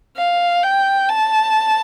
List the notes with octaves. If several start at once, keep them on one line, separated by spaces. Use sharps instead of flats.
F5
G5
A5